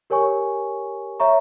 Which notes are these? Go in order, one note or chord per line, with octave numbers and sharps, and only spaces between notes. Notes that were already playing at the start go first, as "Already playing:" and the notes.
G4 A#4 C#5 G#5 C#6
C#5 E5 A#5 C#6